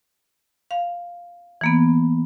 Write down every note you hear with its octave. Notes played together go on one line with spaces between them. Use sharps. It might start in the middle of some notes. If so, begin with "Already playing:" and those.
F5
E3 A#3 B3